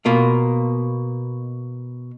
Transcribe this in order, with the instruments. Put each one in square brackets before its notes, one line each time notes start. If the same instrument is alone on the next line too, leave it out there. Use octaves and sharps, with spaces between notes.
[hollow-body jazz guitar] B2 A#3 F4